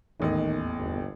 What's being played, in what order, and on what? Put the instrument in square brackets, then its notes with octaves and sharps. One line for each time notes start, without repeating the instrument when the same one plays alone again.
[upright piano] D#1 A1 D#5 [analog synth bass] E2 [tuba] D#3
[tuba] G1